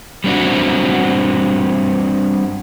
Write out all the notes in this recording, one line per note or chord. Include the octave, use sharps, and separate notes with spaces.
G3 C4 D4 F#4